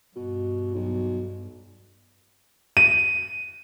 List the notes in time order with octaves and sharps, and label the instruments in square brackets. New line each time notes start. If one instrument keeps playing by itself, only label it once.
[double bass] G2 [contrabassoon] B2
[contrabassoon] B1
[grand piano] D#7